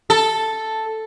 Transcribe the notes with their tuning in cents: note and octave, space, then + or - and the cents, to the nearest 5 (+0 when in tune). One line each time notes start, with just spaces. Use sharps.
A4 +0